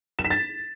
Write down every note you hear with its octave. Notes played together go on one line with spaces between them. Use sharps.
E7
B6
A6